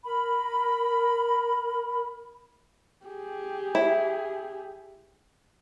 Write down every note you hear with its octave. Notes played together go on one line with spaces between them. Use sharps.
A#4 B5
G4 G#4
E4